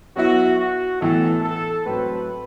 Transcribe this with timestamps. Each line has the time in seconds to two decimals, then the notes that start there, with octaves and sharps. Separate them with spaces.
0.16 F#3 B3 E4 F#4
0.58 F#4
1.00 A2 E3 B3 A4
1.44 A4
1.86 A2 F#3 A3 C4 B4